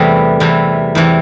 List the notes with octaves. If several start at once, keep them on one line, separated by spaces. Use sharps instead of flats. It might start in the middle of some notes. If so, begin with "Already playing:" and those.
Already playing: E2 C3 E3 G3 A3 B3
E2 C3 E3
E2 C3 E3